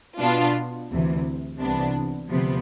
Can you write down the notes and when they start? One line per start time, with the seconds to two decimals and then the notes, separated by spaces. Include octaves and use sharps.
0.20 B2 B3 D4 F4
0.90 D2 C3 E3
1.60 C2 C3 E3 B3 D4
2.30 D2 C3 F3 B3